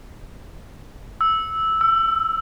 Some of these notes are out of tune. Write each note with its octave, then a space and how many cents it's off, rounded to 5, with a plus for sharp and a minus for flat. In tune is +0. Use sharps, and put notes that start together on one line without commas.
E6 -10
E6 +20